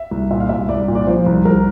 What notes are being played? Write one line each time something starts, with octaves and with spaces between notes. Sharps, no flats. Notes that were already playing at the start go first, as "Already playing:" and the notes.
Already playing: E5
C2
A#2 E5
F5
C2 E5
C2 D5
A#2
D5
F3 C5
C2
C2 A#4